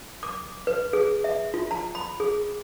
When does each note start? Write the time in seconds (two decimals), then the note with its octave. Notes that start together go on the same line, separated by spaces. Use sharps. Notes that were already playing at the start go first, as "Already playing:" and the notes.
0.23 D6
0.67 B4
0.93 G#4
1.24 E5
1.54 F4
1.71 A#5
1.95 B5
2.20 G#4